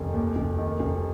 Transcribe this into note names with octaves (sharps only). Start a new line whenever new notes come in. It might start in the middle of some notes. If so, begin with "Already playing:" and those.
Already playing: F1 D#3
D#2
F1
D#3
F1